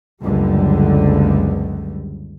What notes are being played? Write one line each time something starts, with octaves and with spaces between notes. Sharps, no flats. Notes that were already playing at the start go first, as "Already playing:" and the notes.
F#1 C#2 D3 G3